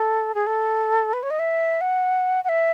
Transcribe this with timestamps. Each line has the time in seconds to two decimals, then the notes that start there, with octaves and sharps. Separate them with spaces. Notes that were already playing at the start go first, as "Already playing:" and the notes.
Already playing: A4
0.35 G#4
0.47 A4
1.13 B4
1.23 C#5
1.30 D#5
1.39 E5
1.81 F#5
2.44 F#5
2.49 E5